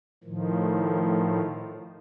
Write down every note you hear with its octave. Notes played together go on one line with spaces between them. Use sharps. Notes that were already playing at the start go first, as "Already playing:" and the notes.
A2 D#3 F3